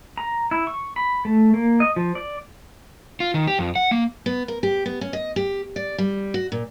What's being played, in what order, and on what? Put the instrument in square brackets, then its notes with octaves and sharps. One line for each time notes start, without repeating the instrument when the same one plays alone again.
[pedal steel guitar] A#5
E4
C#6
B5
A3
A#3
D#5
F3
D5
[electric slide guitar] F4
D#3
G4
F2
F#5
A#3
[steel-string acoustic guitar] B3
A#4
G4
B3
C#4
D#5
G4
D5
G3
F#4
A#2